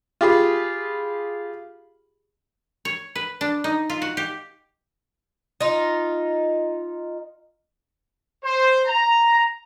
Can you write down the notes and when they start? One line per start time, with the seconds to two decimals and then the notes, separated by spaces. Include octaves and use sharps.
0.21 F4 G4 G#4 B5
2.85 C#5
3.15 B4
3.41 D4
3.64 D#4
3.90 F4
4.02 F#4
4.17 G4
5.61 D#4 F4
8.44 C5
8.85 A#5